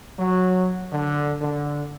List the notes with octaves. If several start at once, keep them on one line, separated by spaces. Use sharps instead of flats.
F#3
D3
D3